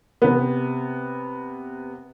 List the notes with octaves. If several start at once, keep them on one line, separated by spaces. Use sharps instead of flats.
C3 B3